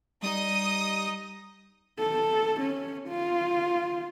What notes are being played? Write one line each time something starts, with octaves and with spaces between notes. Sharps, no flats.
G3 D#4 D#5 D#6
A4
C#4
F4